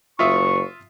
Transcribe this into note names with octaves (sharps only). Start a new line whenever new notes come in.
F#1 F4 E5 C#6 D#6